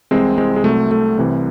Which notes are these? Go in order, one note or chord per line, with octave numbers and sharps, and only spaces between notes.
C2 C3 E3 G#3 C4
G#3 C4
G#3
C2 C3 F#3 A3
A3
C2 C3 E3